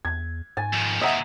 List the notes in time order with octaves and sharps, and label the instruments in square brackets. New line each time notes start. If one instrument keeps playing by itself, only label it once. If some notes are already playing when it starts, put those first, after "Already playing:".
[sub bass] E2 [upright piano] G#6
[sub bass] G#2 [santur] G#5 [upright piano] A6
[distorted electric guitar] F2 D#3
[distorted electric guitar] D#2 C3 [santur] D#5 A#5 [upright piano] E5 F#5